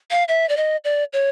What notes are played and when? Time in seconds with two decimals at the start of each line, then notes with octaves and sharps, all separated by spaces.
0.11 F5
0.28 E5
0.49 D5
0.57 D#5
0.84 D5
1.13 C#5